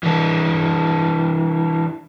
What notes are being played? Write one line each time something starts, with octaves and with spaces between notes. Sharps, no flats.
E3 D4